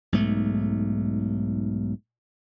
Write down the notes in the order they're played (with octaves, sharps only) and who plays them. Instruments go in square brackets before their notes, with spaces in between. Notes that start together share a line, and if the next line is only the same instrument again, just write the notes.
[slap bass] B1 G#2 A3